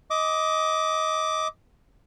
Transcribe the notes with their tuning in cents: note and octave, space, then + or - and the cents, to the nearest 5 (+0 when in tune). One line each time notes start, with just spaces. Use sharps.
D#5 +20 D6 +0